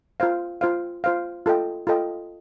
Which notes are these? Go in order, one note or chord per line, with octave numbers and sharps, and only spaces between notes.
F4 C5 F5
F4 C5 F5
F4 C5 F5
F4 A4 D#5 G5
F4 A4 D#5 G5